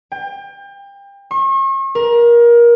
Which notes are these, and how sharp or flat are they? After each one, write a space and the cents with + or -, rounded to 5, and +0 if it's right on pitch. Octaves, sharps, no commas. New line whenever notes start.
G5 +30
C#6 -40
A#4 +25